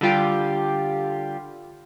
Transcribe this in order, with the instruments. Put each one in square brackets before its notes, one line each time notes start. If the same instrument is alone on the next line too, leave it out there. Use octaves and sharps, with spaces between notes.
[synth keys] D3 G3 F4 G4